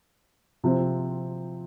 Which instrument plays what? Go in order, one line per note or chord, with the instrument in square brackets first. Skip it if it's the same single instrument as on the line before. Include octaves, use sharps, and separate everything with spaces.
[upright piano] C3 F3 C4